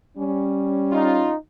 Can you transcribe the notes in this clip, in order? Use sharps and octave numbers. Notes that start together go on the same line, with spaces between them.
G3 C#4
D#4 F4